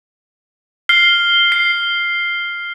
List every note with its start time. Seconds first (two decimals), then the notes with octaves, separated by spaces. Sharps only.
0.89 F6 C7 G7
1.52 C7